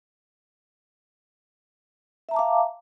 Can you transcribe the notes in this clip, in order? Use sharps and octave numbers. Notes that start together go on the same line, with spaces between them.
E5 F5 A5 A#5 D6